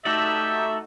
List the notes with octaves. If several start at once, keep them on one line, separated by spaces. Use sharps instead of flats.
A3 D#4 F#4 G4 A4 D5 E5